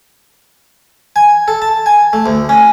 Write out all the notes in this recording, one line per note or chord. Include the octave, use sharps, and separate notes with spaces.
G#5
A4
A5
G#5
A3
D2
C#4